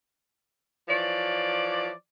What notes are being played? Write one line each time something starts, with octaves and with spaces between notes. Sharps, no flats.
E3 F3 C#5 D5